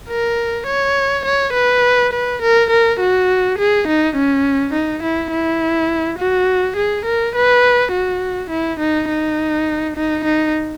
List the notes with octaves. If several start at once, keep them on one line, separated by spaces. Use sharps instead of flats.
A#4
C#5
C#5
B4
B4
A#4
A#4
F#4
G#4
D#4
C#4
D#4
E4
E4
F#4
G#4
A#4
B4
F#4
E4
D#4
D#4
D#4
D#4